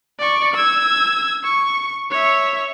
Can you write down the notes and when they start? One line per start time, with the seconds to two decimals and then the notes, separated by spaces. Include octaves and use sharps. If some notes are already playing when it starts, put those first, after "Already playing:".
0.19 D5 C#6
0.54 E6 G#6
1.44 C#6
2.11 C#5 E5